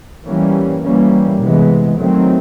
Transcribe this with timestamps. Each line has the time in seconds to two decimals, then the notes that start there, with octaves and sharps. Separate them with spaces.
0.25 E3 G3 A#3 C#4
0.83 E3 G3 A#3 C#4
1.42 C3 E3 G#3 B3
1.98 D#3 F#3 A3 C4